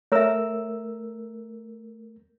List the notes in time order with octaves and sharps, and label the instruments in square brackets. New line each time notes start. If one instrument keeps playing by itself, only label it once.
[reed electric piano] A3 A#4 E6 [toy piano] C#5 E5